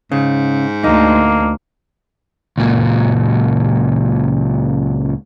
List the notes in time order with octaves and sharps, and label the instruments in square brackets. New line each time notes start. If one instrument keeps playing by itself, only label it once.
[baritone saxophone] G#2 [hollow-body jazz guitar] C#3
[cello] D2 D3 [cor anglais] A#3 [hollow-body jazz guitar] D#4
[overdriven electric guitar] C#2 A#2